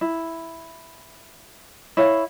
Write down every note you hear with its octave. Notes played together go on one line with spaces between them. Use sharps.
E4
E4 C#5 F5